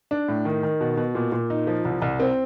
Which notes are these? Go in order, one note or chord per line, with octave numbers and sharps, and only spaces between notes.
D4
A2
D#3
D#3
B2
B2
A#2
A#2
D#4
F3
C2
C2
C4